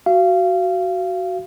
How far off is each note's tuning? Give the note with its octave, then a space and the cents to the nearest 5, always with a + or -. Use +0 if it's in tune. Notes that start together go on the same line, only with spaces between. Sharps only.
F#4 +10 F5 -25